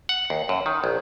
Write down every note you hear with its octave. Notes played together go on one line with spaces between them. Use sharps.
F#5
D#2
F#2
D#3
A#1